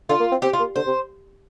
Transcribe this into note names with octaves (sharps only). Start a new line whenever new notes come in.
D3 F4
A#3
C4
C4 G4
F4
A#3
D3 C5
C3